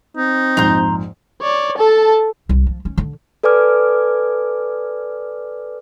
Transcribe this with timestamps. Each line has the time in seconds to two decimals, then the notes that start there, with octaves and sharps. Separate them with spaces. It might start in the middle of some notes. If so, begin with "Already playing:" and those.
0.16 C4 D#4
0.57 A#1 F2 G#2 A#5 C6 G6
1.42 C#5 D5
1.78 A4 A5
2.49 C2
2.67 F3
2.85 C#4
2.98 D3
3.43 A4 B4 D5 G#5 D6 F6